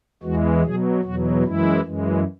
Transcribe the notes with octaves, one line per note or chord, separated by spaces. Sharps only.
E2 E3 G#3 F#4
B2 F#3 G#4
E2 B2 F#3 F#4
F#2 E3 G#3 E4
F#2 E3 G#3